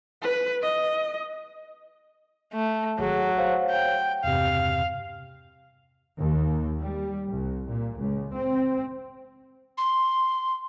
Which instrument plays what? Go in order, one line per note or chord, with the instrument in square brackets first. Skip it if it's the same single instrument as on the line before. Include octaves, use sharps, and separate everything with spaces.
[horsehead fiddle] B4
D#5
[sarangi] A3
[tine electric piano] G#1 G#4 [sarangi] F#3
[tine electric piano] C5 C#5 F5
[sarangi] G5
[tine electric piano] E2 G2 C3 [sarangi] F5
[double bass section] D#2
G3
C2
A#2
C#2
C4
[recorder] C6